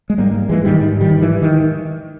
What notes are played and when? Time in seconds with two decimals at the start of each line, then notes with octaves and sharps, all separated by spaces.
0.10 G#3
0.18 G#2 G3 A#3
0.34 G3 A#3
0.49 G#2 E3 G#3
0.64 D#3 G3
0.81 G#2
1.01 D#3 G3
1.12 G#2
1.21 E3
1.42 D#3